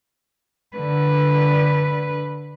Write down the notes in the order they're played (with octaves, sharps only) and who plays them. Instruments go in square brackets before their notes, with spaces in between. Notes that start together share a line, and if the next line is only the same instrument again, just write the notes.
[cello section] D3 [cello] B4